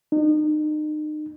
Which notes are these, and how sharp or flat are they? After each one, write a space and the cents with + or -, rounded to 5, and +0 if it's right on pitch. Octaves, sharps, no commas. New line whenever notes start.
D#4 -35